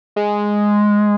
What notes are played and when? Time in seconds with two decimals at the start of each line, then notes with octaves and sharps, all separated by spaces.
0.16 G#3